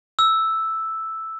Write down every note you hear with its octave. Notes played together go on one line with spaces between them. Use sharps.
E6